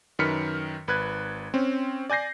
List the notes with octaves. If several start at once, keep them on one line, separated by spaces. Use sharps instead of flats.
F#2 D#3 B4 F6 B6 C#7
G#1 B4 F#6 G#6
C4 C#4
D5 G#5 G6 A#6 C7